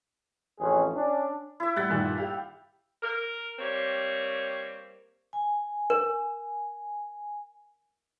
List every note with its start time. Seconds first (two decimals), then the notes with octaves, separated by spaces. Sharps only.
0.59 A1 F2 C#4 G#4
0.94 C#4 D4
1.60 E4 E5
1.76 G3 F#5 G6 A6
1.89 G2 A#2 D#3
2.18 G4 F5
3.03 A#4
3.59 G3 A#3 C4 C#5
5.33 G#5
5.90 A#4